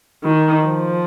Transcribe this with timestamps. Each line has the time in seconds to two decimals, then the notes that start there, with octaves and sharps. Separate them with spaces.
0.24 D#3
0.65 F3